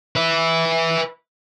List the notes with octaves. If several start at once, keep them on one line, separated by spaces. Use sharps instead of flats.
B4 E5